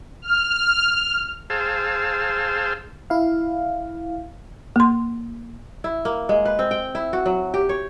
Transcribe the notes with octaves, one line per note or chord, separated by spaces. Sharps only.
F6
G#4 C5 F5 G5 A5 E6
E4 F5
A#3 C6
E4
A#3
G#3
B4
C4
G5
E4
F#4
F#3
G4
C#5